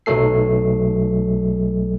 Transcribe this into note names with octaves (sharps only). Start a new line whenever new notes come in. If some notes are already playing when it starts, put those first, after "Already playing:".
B1 F#3 A3 A4 C7